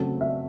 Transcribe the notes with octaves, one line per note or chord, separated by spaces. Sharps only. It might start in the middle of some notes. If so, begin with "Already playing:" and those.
Already playing: C#3 F#3 A3 C4
E5